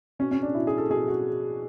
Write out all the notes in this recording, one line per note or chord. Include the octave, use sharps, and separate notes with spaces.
B2 C#4
C#4
D4
B2 E4
G#4
A4
B2 G#4
F#4